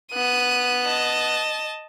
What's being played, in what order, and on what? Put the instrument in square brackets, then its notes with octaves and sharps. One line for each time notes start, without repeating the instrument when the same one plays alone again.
[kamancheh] B3 F#6 [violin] D#7
[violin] D#5 A5